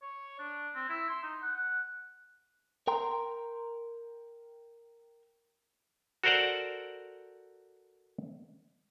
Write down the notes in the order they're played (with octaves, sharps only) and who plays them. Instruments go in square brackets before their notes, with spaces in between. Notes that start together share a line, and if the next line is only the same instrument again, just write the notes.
[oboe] C#5
D4
C4
E4
C6
D#4
F#5
F#5
[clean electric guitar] A#4 G5 A#5 C6
[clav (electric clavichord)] F#4 A4 A#4 C5 D5 F#5